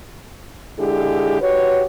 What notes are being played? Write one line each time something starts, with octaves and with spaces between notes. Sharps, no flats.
D3 G#3 E4 G4 G#4
F#4 G4 B4 C#5